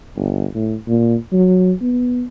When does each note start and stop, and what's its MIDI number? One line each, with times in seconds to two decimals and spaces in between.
0.16 0.46 31
0.54 0.75 45
0.87 1.15 46
1.32 1.72 54
1.81 2.24 59